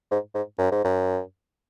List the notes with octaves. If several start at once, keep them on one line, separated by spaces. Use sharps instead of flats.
G#2
G#2
F#2
G#2
F#2